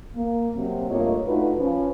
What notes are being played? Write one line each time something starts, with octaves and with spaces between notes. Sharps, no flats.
A#3
C3 F#3 A#3 C4
G2 A3 A#3 F4 C#5 D#5
A3 D4 D#4 F4 F#4 B4
F3 C#4 B4